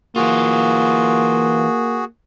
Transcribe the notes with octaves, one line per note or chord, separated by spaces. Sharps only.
E3 A#3 F4 F#4 G#4